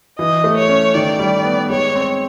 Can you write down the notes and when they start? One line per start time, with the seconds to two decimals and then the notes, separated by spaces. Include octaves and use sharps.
0.19 E3 D#5
0.44 A3
0.57 C#5
0.69 C#4
0.94 D#3 D5
1.19 G3
1.44 B3
1.69 G#3 C#5
1.95 C4